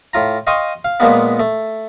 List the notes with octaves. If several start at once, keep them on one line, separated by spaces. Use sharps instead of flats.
A2 F4 A#5
D#5 F5 G5 C6 C#6 D#6
F5
A#2 F3 G#3 A#3 B3
A3